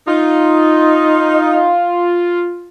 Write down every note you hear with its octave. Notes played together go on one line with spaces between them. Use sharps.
D#4 F4